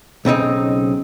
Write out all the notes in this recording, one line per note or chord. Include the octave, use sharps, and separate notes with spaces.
B1 C#3 C4 D#4